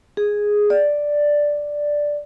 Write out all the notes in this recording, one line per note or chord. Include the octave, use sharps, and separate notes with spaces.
G#4
D5